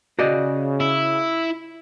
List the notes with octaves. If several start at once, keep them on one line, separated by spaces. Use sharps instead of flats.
C#3 F#4 D5 D#5
E4